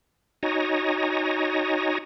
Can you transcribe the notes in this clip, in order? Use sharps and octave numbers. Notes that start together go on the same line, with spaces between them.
D#4 F#4 C#5 D#5 G#5 A#5